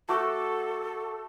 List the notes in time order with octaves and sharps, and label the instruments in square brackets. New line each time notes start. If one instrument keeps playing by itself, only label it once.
[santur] A3 F#4 D6 [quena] A4